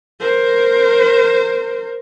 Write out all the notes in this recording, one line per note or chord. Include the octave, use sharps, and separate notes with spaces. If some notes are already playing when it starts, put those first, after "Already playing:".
A#4 C5